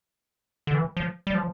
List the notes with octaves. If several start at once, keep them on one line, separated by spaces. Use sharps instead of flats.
D3
E3
F3
G3
F3